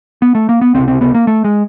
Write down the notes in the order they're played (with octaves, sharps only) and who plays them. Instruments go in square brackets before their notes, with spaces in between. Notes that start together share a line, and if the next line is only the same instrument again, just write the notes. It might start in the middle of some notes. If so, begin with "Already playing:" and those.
[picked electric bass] B3
A3
A#3
B3
C#2 C3 C4
C4
B3
A#3
A3
G#3